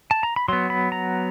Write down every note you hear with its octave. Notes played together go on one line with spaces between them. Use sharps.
A5
A#5
B5
F#3 B3 C6
B5
A#5